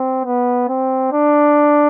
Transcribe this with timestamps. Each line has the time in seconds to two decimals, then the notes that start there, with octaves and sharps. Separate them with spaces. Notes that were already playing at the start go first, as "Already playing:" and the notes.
Already playing: C4
0.25 B3
0.69 C4
1.12 D4